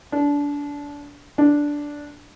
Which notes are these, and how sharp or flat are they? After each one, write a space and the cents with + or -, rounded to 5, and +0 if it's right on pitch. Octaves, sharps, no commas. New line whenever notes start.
D4 -25
D4 -5